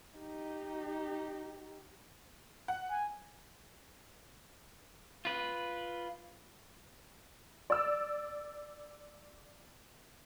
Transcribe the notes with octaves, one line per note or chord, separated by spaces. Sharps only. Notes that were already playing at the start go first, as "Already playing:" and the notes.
D#4 G4
F#5
G#5
F4 B4
D5 E6